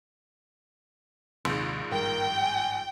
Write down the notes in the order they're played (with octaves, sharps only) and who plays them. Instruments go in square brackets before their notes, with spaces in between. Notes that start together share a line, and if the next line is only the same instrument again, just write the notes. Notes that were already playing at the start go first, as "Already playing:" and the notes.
[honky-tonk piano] A#1 G#2 [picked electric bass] D#2 C3
[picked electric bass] G#1 G2 [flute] A#4 [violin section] G5
[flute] G#5